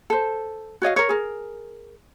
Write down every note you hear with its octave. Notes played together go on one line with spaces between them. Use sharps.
A4 C5
F#4 C#5 D#5 F5
A#4 C#5
G#4 A#4